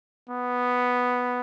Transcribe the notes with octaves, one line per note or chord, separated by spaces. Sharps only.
B3